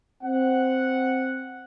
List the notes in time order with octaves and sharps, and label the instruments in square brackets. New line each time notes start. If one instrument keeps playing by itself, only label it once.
[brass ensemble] C4 F#5